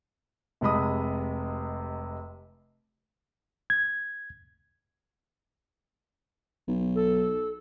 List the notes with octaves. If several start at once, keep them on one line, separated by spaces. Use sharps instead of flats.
F1 C3 G#3 B5 D#6
G#6
B1
A4